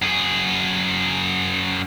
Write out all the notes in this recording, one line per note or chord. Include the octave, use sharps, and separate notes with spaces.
F#2 G#4